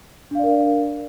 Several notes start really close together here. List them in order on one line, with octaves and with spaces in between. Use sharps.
D4 F5 D5 A#4